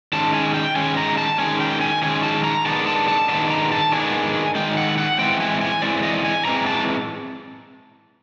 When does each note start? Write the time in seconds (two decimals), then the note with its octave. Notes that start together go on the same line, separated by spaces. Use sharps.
0.13 D#3 G#3 C#4 A5
0.34 G#5
0.54 G5
0.76 D#3 G#3 C#4 G#5
0.97 A#5
1.18 A5
1.38 D#3 G#3 C#4 G#5
1.60 G5
1.81 G#5
2.03 D#3 G#3 C#4 G#5
2.23 A5
2.44 A#5
2.66 D#3 G#3 B3 D4 A5
2.87 A5
3.08 A5
3.29 D#3 G#3 B3 D4 A5
3.50 A#5
3.72 A5
3.92 D#3 G#3 B3 D4 G#5
4.55 D#3 G#3 G5
4.77 F#5
4.98 F#5
5.19 E3 G#3 C4 G5
5.40 G#5
5.61 G#5
5.82 E3 G#3 C4 D5
6.03 D#5
6.24 G#5
6.45 E3 G#3 C4 A#5
6.66 A5